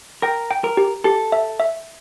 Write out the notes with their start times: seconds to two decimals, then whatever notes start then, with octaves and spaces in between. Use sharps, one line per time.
0.22 A#4 G5
0.51 G5
0.64 A#4
0.77 G4
1.04 G4 A4
1.32 E5
1.60 E5